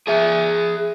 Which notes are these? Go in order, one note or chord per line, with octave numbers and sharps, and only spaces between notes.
G#4 E5